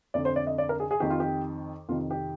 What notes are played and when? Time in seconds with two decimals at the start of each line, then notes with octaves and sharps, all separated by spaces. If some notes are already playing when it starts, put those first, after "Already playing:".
0.14 F2 D3 D5
0.25 C5
0.36 D5
0.47 D#5
0.58 D5
0.69 A#4
0.80 G#4
0.91 G#4
1.00 F2 D#3 G4
1.10 F4
1.20 G4
1.89 F2 C3 D#3 F4
2.11 G4